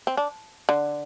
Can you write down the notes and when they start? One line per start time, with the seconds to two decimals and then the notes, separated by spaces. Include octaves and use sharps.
0.07 C4
0.17 D4
0.69 D3